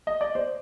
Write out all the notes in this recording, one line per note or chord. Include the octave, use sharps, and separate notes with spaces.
D#5
D5
C5